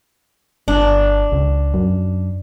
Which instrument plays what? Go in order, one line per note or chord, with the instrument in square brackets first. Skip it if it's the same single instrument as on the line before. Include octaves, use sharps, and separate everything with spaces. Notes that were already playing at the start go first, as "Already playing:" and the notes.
[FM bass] G1 [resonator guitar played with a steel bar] D4
[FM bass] C#2
F#2